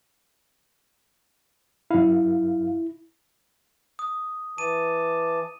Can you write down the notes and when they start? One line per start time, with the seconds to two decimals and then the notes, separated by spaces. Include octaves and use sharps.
1.91 F#2 E4 F5
3.99 D#6
4.58 E3 A5 D6 D#7